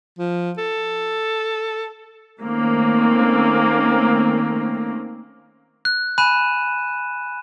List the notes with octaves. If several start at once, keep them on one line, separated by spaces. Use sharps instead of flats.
F3
A4
D#3 A3 A#3 C4 C#4
F#6
G#5 B5 F#6 D#7 E7